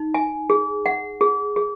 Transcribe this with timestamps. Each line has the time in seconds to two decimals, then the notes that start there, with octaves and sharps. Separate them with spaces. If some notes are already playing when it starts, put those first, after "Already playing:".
Already playing: D#4
0.14 G#5
0.50 G#4
0.86 F#5
1.21 G#4
1.56 G#4